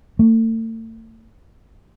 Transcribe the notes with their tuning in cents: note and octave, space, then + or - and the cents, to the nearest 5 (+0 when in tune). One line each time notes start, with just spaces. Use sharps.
A3 +40